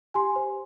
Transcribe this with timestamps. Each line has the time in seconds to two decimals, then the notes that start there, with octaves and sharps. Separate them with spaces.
0.14 G4 G#5 C6
0.36 C5